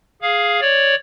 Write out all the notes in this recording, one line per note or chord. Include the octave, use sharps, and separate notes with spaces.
G#4 F5
C#5 D5